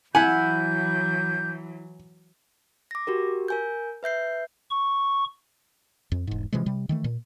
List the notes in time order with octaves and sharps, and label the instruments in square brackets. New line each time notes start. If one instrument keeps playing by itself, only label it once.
[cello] E3 F#3 [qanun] E4 F#5 [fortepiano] G#5 [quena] G6
[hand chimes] D6 A#6
F#4 G4 A#4
A#4 G#5 G6
B4 E5 G6 C7
[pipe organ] C#6
[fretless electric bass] F2
E1 G#2
C3 E3 F3 G#3
C3 G3
D#3 E3 A3
A#2